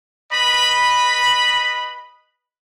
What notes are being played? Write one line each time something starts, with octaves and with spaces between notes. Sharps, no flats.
B4 D#5 B5